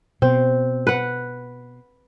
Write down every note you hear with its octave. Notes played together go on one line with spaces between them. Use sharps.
B2 C4
B4 F#5